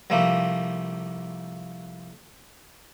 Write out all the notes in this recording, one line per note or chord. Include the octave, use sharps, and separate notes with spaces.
C2 F3 G3 A3 A#3